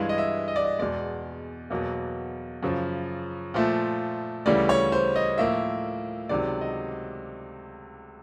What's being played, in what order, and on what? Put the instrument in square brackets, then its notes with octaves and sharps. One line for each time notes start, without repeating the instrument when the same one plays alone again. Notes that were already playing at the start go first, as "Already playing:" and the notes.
Already playing: [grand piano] G2 E3 G#3 F5
D#5
E5
D#5
D5
D#5
E2 B2 G#3 D5
E2 B2 F#3 A#3
F#2 C#3 F3
A#2 F3 A3
D2 C#3 E3 G3 D5
C#5
C5
D#5
A2 F3 A#3 E5
C#2 C3 D#3 F#3 D5
D#5